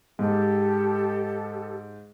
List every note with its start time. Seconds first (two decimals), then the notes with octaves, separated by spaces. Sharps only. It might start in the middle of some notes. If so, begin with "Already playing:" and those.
0.19 G#2 G4 A4